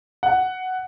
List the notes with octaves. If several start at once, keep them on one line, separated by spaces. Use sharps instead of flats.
F#5